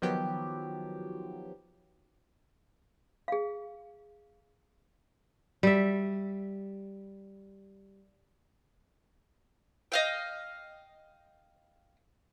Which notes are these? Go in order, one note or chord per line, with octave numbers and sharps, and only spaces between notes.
D#3 F3 F#3 B3 G4
G#4 F5
G3 E5
D#5 F5 G5